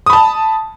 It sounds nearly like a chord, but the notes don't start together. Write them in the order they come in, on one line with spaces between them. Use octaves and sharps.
D#6 B5 A5